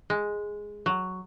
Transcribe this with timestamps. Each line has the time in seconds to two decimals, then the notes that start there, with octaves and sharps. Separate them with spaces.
0.10 G#3
0.86 F#3